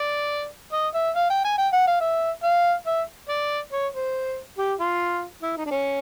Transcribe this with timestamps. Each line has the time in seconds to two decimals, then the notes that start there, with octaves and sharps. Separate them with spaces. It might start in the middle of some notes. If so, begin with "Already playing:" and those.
Already playing: D5
0.73 D#5
0.94 E5
1.16 F5
1.30 G5
1.45 G#5
1.58 G5
1.73 F#5
1.87 F5
2.01 E5
2.43 F5
2.87 E5
3.29 D5
3.72 C#5
3.94 C5
4.58 G4
4.79 F4
5.43 E4
5.57 D#4
5.66 D4
5.71 C#4